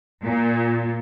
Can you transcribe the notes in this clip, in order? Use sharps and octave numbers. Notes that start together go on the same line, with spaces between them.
A#2